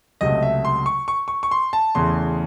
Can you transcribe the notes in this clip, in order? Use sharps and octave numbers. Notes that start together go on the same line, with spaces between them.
C#2 C3 F#3 A3 D#5
E5
C6
C#6
C#6
C#6
C#6
C6
A5
E2 C#3 E3 A3 C6